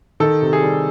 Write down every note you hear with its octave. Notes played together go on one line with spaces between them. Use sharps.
D#3 A4
C3
G#4
G3